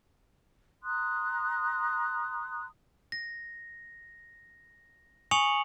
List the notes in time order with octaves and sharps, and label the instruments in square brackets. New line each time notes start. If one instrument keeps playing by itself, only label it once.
[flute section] A#5 C6 D#6 F#6
[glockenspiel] A#6
G#5 C#6 D#6 C#7 F7 F#7